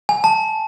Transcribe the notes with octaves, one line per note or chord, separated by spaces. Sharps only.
G#5
A5